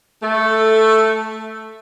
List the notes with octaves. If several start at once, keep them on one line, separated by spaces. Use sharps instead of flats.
A3 A4